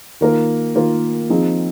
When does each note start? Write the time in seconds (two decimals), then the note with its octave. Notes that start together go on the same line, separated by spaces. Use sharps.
0.21 D#3 A#3 F4 A#4
0.75 D#3 A#3 F4 A#4
1.29 F3 C4 D#4 G#4